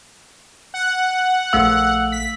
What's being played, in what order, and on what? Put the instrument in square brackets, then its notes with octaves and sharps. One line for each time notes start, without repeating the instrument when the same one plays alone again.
[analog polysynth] F#5
[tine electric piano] A#1 A3 F5 [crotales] E6
[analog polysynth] B6